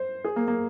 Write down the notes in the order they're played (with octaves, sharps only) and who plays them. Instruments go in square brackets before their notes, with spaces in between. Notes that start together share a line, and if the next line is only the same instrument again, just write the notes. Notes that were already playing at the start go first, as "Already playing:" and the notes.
Already playing: [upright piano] C5
G#4
A#3
A#3